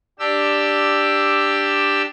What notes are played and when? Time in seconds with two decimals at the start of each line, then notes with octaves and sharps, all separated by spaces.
0.19 D4 G4 E6